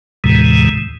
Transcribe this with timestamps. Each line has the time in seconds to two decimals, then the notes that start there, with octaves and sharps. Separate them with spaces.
0.24 D#2 A2 C3 E3 G#3